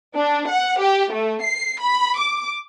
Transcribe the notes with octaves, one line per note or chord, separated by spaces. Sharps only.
D4
F#5
G4
A3
C7
B5
D6